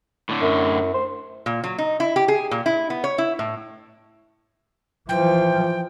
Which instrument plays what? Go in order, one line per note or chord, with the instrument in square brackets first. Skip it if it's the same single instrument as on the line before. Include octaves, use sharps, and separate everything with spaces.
[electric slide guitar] A2 D3
[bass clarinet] F#2
C5
[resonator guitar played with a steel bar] A#2
F#3
D#4
E4
G4
G#4
A#2
E4
B3
C#5
E4
A2
[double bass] E3 F3 [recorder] G5